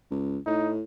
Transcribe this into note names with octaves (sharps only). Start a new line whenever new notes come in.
C#2
A2 D#4